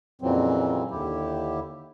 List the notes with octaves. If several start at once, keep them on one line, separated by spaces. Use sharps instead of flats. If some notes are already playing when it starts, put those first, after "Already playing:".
F2 A#2 C#3 E3 F#3 C4
D#2 D3 E4 G4